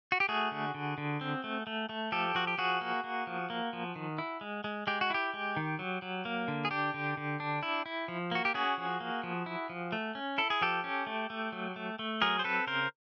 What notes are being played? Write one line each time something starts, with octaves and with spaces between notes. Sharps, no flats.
F#4
G4
A3 F#4 G#4
D3
D3
D3
C4
A3
A3
A3
F3 G4 A4
F3 F#4
G4
F3 F#4 G#4
A#3
A#3
F3
A#3
F3
D#3
E4
G#3
G#3
G#3 G4
F#4
E4 G4
G#3
D#3
F#3
F#3
A#3
D3
G#4
D4 G4
D3
D3
D4
E4
E4
F3
A#3 F#4
G4
C#4 F#4 G#4
F3
A#3
F3
E4
F3
A3
C#4
E4 A4
G#4
F3 G4 A4
C#4
A3
A3
F#3
A3
A3
F#3 G#4 A#4
C5
C4 A4 B4
C#3 A#4 C5